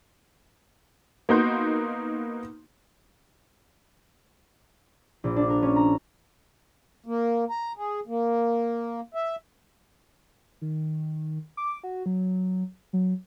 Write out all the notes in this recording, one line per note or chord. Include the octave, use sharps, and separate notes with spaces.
A#3 B3 D#4 F#4 C6 G6
A#1
D4
A#4
C#4
A#5
A#3
A#5
G#4
A#3
E5
D#3
D6
F#4
F#3
F#3